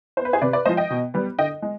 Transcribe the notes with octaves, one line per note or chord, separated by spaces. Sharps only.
B3 C5
B4
G#4 C5
C3 B4 D5
B4 D5
F3 G#3 C5 D#5
D#5 G5
B2
G3 B3
D3 D#5 G5
G#3